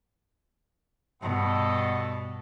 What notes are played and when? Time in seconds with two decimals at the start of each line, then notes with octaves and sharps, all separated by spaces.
1.22 G2 B2 B3 A4 D#5